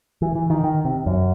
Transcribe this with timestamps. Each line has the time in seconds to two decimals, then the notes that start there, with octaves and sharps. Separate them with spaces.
0.22 E3
0.35 E3
0.50 D#3
0.64 D#3
0.85 C3
1.06 F#2